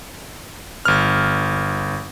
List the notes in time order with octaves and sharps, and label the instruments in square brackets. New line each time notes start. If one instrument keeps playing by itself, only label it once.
[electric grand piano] G1 F6